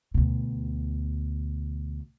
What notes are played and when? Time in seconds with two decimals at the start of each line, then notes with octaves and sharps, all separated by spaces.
0.14 D2 B2